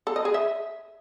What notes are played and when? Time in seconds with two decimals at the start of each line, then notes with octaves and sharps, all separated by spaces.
0.07 A4
0.16 D#5
0.25 G#4
0.34 E5